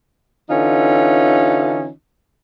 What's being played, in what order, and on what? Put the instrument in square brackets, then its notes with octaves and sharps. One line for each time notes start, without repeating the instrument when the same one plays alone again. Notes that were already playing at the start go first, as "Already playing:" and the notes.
[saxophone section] D3 E3 C#4 D#4 F4